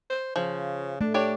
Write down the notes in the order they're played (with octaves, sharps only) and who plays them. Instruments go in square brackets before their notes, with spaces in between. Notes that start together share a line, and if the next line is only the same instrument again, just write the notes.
[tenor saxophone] C5
[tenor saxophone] C#3 [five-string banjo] F3
[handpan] A3 [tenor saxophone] D4
[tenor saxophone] D4 [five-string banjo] G4 C#5 D5